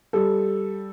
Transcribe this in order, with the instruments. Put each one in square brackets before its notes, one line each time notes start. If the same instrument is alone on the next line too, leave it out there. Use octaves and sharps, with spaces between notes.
[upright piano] G3 A4